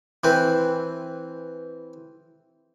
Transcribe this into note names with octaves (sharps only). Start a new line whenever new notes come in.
E3 C4 B4